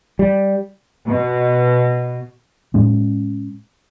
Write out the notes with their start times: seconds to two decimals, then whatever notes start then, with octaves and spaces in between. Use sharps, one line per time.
0.19 G3
1.07 B2
2.74 A2 G#3 C#4